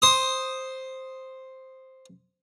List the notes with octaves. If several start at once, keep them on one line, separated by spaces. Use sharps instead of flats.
C5 D#6